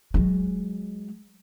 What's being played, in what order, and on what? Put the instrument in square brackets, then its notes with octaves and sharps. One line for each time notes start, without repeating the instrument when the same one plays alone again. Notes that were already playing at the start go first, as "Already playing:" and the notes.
[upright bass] F#3 G#3